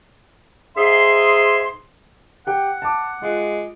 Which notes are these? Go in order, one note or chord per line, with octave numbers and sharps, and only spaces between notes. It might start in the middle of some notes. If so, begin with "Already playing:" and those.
G#2 G#4 E5 C6
G4 F#5 G5
A5 D6
G#3 F4